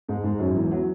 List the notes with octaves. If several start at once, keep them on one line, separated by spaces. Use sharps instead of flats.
G#2 G#3
G#2 G#3
F#2 F#3
E2 E3
F#3